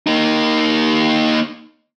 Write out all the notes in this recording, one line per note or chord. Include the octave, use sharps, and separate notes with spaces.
A#3 D#4